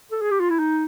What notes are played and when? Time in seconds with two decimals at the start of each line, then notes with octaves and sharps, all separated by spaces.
0.12 A4
0.22 G#4
0.31 G4
0.40 F4
0.50 E4
0.59 D#4